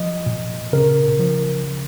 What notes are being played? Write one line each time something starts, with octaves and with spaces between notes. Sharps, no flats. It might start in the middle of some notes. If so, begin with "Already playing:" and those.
Already playing: F3 D#5
A#2
C#3 A#4
F3